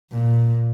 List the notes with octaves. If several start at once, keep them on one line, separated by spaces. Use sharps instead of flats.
A#2